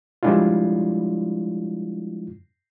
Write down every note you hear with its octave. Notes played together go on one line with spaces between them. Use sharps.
F3 G3 G#3 D4 E4 F4